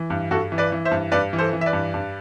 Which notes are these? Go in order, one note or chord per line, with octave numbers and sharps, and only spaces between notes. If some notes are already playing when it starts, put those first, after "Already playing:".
Already playing: E3
G2
G2 F#4 A4
E3
B4 D5
E3
C5 E5
G2
G2 B4 D5
E3
A4 C5
E3
E5
B4 D5
G2
G2